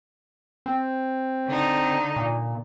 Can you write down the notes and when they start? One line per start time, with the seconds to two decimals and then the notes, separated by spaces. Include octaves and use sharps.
0.66 C4
1.47 D3 D#4
2.16 A#2